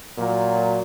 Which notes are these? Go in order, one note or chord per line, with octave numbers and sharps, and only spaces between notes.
A#2 F#3